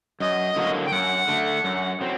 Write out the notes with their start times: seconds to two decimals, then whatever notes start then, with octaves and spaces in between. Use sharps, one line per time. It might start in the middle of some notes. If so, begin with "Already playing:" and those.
0.20 F#2 D#5
0.56 D3 F#3 A#3 F#4
0.86 G5
0.92 F#2 F#5
1.27 D3 A3
1.64 F#2
2.01 F#3 C4